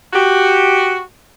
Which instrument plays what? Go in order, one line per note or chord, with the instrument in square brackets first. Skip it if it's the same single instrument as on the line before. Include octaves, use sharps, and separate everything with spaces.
[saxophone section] F#4 G4